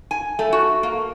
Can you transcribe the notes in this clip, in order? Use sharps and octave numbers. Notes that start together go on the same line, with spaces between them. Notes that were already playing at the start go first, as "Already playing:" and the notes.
G#5
A3
F#4
A#3